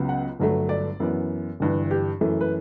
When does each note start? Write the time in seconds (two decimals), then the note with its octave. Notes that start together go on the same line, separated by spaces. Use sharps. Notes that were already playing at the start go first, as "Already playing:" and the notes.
Already playing: C#2 C#3 F#3 B3
0.09 F#5
0.40 G1 G2 F#3 A3
0.69 D5
1.00 F#2 E3 B3
1.60 G1 G2 E3
1.91 G4
2.21 F#2 E3 A3
2.41 B4